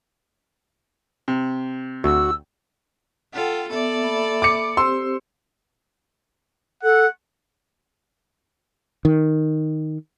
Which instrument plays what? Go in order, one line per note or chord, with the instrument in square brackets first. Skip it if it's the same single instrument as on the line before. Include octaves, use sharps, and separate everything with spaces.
[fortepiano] C3
[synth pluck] D2 [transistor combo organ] F#4 [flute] E6
[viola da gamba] F4 A4 [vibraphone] F#5 G5
[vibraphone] B3 E5 [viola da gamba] A4 D5
[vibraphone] A#3 E5 B5
[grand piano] D6 C#7
[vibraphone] C4 G4 C5 [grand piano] C6 E6
[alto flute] A4 [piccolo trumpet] F#5
[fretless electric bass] D#3